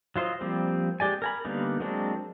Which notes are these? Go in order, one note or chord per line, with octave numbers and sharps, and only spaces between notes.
F#3 F4 C5 D#5
F3 G3 A#3 C4
G#3 G4 D5 G#5
A#4 G#5 B5
D3 G3 A#3 B3 D#4
F#3 G#3 A#3 C4 D4